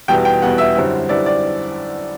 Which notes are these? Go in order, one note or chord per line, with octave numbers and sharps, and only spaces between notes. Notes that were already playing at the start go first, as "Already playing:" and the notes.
E2 B2 G3 B3 E4 G5
G5
E2 B2 G3 B3 E4 F#5
E5
F#2 D3 G3 C4 E4
F#2 D3 G3 C4 E4 D5
D5